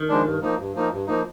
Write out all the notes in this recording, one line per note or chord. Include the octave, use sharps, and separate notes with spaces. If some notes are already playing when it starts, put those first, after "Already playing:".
Already playing: D#3
F3 G#3 D4
G2
F3 A#3 D#4
G2
F3 A#3 D#4
G2
F3 A#3 D#4